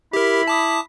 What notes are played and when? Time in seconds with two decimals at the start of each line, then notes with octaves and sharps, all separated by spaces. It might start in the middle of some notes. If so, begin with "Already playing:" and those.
0.13 E4 G4 A#4 B5
0.47 A5 D6 D#6